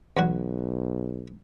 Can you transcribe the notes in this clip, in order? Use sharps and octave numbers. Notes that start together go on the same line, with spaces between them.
B1 E2 F#3 F#4